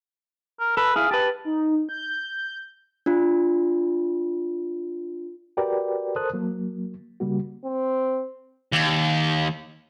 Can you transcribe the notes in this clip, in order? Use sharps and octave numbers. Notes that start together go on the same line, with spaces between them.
A#4
A4 B4
E4 G#4 F5
G4 B4 A5
D#4
G6
D4 F4
F#4 G4 A#4 B4 D5 G5
A4 A#4 C5 A5 D#6 F#6
F#3 A#3
C#3 G3 A#3 F#4
C4
D#2